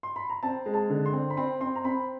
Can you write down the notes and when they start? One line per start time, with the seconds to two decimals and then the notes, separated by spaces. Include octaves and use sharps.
0.03 C6
0.16 B5
0.30 A#5
0.43 C4 A5
0.66 G#3
0.74 A5
0.90 D3
1.06 C6
1.13 C4
1.30 B5
1.37 C4 C6
1.61 C4 C6
1.75 A#5
1.85 C4 B5